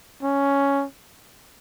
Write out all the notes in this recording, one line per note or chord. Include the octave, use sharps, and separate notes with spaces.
C#4